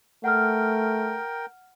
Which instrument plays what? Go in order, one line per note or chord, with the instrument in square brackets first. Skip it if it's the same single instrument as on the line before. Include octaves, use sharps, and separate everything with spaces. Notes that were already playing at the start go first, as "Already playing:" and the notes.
[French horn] A3 [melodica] A#4 G5 [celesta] F#5 F6